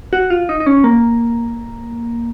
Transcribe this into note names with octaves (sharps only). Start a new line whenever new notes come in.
F#4
F4
D#4
D#4
C#4
A#3